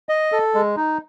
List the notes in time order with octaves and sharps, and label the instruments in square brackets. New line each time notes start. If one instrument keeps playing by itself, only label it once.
[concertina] D#5
A4
G#3
D#4